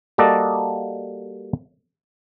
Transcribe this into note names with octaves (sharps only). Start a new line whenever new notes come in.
G3 A#3 F#4 A4 D5 D#5